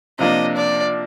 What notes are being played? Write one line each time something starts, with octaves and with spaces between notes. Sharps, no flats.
C3 F3 A#3 D4 D#5
D5